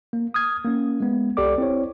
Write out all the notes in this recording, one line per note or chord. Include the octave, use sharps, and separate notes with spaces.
A#3
D#6 F6 G#6
A#3 C#4
G#3 B3
C2 G4 A4 D5 D6
C4 E4 C#5